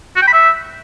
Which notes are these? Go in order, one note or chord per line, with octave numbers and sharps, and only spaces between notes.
F#4
G5
B5
E5